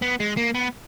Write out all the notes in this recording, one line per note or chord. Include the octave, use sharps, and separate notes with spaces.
B3
G#3
A#3
B3